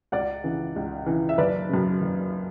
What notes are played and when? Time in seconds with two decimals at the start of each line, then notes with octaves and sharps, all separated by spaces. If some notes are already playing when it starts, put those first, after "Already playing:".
0.12 C#2 D5 F#5
0.44 C#3 E3
0.76 C#2
1.06 C#3 E3
1.29 E5
1.38 F#1 B4 D5
1.69 F#2 C#3
2.01 F#1